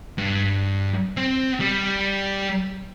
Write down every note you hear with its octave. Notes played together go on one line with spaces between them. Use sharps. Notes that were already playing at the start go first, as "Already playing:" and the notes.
G2
C4
G3